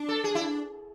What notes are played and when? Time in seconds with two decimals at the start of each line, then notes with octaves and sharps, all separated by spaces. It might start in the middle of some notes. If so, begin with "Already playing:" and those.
Already playing: D4
0.09 A4
0.24 G#4
0.35 E4